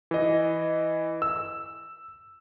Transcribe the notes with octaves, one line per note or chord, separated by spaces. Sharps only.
E3 D#5
E6